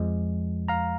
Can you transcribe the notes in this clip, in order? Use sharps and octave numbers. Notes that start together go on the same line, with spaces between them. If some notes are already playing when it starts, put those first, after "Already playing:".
Already playing: F2 F3 G#3
F5 A#5